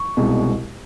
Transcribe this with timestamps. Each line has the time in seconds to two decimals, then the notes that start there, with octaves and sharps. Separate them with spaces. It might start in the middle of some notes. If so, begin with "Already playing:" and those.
Already playing: C#6
0.17 C2 B2 G#3 C4 D#4